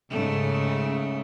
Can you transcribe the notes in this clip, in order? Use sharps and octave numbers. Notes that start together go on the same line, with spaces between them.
G#2 C#3 A3